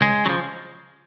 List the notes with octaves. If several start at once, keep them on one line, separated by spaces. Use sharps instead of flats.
C#2 G#3
C#3 F3 F#3